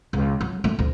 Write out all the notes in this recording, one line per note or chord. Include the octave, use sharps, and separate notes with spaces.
C#2
F#3
A3
D2